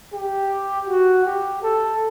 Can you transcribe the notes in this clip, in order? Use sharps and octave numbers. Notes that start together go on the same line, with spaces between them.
G4
F#4
G4
A4